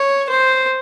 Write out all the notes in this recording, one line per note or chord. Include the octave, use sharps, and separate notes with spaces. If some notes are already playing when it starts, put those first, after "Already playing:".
Already playing: C#5
C5